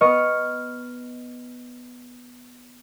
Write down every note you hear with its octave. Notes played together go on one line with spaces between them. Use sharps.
B3 D#5 C#6 F6